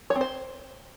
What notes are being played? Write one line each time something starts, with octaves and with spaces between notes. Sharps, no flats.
C#5
C4
C5